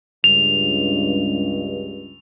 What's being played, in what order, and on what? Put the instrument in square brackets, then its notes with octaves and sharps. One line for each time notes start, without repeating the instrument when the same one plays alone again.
[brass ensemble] C#2 G2 [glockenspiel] F7